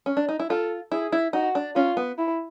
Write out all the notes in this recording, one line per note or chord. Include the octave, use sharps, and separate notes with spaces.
C#4
D4
D#4
E4
F4 A4
E4 G#4
E4
D#4 F#4
D4
C#4 F4
B3
E4